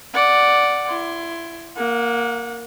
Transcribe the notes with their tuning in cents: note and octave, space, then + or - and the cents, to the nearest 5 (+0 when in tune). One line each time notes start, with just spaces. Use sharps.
D5 +0 F#5 +0
E4 +25 C6 +5
A#3 +0 F#5 -30